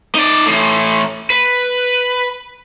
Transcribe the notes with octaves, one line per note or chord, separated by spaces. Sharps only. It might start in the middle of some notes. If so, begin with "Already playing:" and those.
D#4 D5
A2 E3
B4